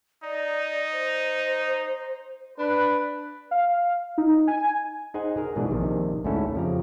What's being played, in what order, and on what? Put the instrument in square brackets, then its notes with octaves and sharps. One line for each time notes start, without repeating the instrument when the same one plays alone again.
[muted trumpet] D#4 [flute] D5
[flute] C5
[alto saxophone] D4 [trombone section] B4
[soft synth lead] F5
D#4
G#5
[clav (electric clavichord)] D#4 G#4 C5 F#5 G#5
G#4 A#4
G#2 B2 E3 D4 G#4
A#1 C3 D#3
D2 G#2 A3 C#4 E4 A4
F2 C#3 F3 G4 A#5